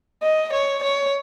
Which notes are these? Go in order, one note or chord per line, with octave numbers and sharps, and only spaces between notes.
D#5
C#5
C#5